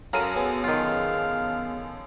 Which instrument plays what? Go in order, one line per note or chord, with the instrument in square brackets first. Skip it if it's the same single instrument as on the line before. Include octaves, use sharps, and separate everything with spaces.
[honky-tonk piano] F#2 A4 D#7 [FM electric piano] C#4 A#4 F5 [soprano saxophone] F#4
[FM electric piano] B3 G#4
[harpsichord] D#3 F4 [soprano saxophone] F5